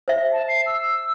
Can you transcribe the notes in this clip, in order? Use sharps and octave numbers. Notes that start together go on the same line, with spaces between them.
C5 E5
A5
C7
E6